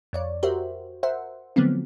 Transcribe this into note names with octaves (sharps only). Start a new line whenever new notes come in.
F2 C#5 D5
F#4 G4 A#4 C5 E5
A#4 C5 E5 F#5
D3 F3 F#3 A3 B3 C4